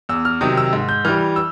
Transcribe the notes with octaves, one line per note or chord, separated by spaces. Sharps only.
E2 E6
F6
C3 D#3 F#3 D#6
E6
G#2
G6
E3 G3 F6
E6